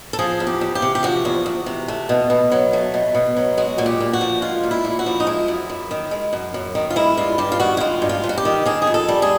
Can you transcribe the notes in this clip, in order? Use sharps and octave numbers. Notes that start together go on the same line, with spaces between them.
A4
F3 G#4
E2
G4
E2
G4
C3
G4
F3 F#4
E2
E2
C3
A3
B2
B2
F#3
A3
B2
B2
F#3
G#3 F#4
A#2 F#4
G4
A#2
F#4
F3
G#3 F4
A#2
E4
A#2
F#4
F3
D#4
G#3 E4
F#2
F#2
D#3
G#3
F#2
F#2
D#3
F4
G#3 E4
G2 F4
G2 G4
F4
D#3 F#4
E4
G#3 F4
G2
F4
G2
F#4
G4
D#3
D#3 G#4
G#4
F2
A4
G3
G#4